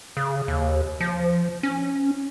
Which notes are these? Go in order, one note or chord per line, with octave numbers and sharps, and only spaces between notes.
C#3
D#2
F3
C#4